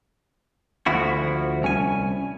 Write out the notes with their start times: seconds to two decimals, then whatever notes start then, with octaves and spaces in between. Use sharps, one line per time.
0.86 D2 F3 E4 F#4
1.62 C2 C#4 G#5